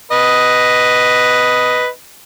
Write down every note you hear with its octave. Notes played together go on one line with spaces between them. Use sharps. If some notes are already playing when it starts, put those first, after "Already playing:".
B4 D#5